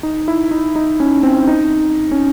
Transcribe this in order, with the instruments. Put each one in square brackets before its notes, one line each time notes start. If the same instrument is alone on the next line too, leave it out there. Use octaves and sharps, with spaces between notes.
[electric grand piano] D#4
E4
D#4
D#4
C#4
C4
D#4
C#4